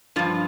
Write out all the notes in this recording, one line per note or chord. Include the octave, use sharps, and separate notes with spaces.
G2 F3 F4